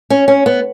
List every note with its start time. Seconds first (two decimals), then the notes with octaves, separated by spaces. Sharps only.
0.10 C#4
0.28 C#4
0.46 B3